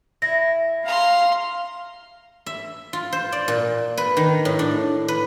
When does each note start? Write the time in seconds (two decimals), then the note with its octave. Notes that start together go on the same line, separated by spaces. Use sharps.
0.22 E4 A#6
0.86 F5 A#5 C6
2.46 E5
2.93 F4
3.13 C5
3.32 D5
3.48 A#2
3.97 B4
4.17 D#3
4.45 A2
4.59 D4
5.08 B4